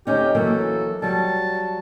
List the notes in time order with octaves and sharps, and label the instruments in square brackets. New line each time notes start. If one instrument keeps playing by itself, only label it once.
[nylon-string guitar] D2 C#4 D#4 [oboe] G4
[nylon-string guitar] E3 F#3 A#3 [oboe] A4
[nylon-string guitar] F#3 G3 [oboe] A5